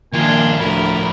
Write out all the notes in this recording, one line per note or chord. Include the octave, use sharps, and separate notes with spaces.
D#3 F3 A#3 D4 F4 G#5
D2 A2 F3 A#4 B5